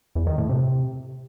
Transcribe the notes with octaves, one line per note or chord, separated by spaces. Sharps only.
E2
D#3
A2
C3